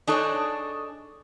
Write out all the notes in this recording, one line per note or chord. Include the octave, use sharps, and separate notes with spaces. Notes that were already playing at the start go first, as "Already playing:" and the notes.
D4 D#4 G#4 A4 C#5 D#5